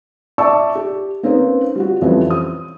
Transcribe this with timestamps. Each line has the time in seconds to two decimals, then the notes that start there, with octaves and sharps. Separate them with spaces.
0.38 D5 E5 A5 C#6 D6 E6
0.75 G4
1.23 A#3 C4 C#4 D#4 B4 C5
1.76 G3 F4 F#4
2.01 F2 E3 F3 G3 C4 C#4
2.30 D#6